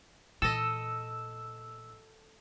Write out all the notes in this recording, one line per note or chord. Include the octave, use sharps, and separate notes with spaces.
A#2 E3 A4 D#5 E6